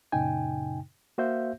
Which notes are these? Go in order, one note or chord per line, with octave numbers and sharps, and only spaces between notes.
F#2 A#2 C#3 D#4 G5 G#5
A#3 F#4 C5 E5 F5 G6